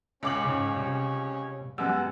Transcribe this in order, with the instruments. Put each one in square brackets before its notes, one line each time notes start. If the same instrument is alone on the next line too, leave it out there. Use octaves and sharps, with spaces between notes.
[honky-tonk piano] C#2 D6 F#7 [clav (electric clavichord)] C#3 [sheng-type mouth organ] C#4 C#5
[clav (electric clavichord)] G#2 C#3
C3 G3
[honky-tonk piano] F#2 E6 [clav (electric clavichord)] G3 G#3 B3 [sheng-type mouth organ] F#5